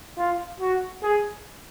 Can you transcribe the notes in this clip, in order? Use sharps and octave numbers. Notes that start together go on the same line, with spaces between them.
F4
F#4
G#4